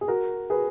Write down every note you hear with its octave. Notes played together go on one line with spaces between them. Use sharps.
G#4
F#4 A#4
G#4 B4